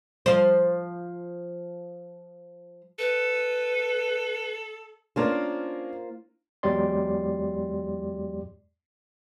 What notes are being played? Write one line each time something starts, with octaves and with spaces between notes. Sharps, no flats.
F3 C5
A4 B4
A#3 C#4 D4 F4 A#4 C5
E2 F#3 G#3 G4 D5 C6